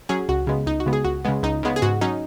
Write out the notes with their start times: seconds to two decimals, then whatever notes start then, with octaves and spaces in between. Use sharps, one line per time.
0.09 F#3 C#4 G#4
0.29 C#2 F#4
0.47 C#3 G#3 B3
0.66 C#2 D#4
0.80 F#4
0.86 C#3 G#3 B3
0.93 G#4
1.05 C#2 F#4
1.25 C#3 G#3 B3
1.43 C#2 D#4
1.63 C#3 G#3 B3
1.76 G#4
1.82 G#2 F#4
2.01 F#3 C#4 D#4